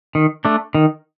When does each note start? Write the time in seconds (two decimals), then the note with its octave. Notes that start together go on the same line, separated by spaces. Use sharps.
0.15 D#3
0.45 A3 D4
0.75 D#3